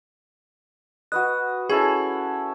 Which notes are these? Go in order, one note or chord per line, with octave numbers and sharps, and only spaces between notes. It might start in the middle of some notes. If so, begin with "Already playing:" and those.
F#4 B4 D#5 F#6
C#4 E4 G#4 A4